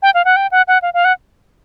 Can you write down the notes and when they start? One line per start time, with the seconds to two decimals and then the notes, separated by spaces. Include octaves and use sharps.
0.02 G5
0.14 F5
0.25 F#5
0.36 G5
0.52 F#5
0.68 F#5
0.82 F5
0.94 F5
1.05 F#5